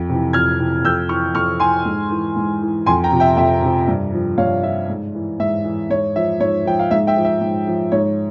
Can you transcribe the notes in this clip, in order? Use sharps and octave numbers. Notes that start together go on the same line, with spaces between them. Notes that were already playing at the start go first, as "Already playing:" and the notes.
Already playing: F2
C3 E3
F2 F6 G#6
C3 E3
F2 E6 G6
E3 C#6 F6
F2 C#6 F6
E3 G#5 C6
G#2
E3
G#2
E3
F2 G#5 C6
G5 A#5
C3 F3
E5 G5
F2 E5 G5
C3 F3
G2
F3
G2 C#5 F5
F3 E5
G#2
E3
G#2 E5
E3
G#2 C#5
F3 E5
G#2 C#5
F3 G5
F5
G#2 E5
E5 G5
F3
E5
G#2
F3
G#2 C#5